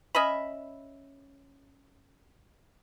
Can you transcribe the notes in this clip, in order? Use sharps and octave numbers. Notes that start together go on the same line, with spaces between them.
C#4 D#5 E5 B5